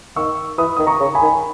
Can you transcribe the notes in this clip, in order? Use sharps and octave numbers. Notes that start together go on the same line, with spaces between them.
D#3 C#6 E6
E3 B5 D#6
D#3 D#6
A#5 C#6
C#3
G#5 B5
D#3